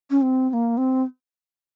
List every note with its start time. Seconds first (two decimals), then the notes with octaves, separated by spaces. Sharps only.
0.11 C#4
0.22 C4
0.50 C4
0.53 A#3
0.77 C4